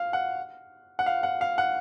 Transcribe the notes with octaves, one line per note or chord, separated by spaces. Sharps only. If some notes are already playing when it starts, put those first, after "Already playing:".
Already playing: F5
F#5
F#5
F5
F#5
F5
F#5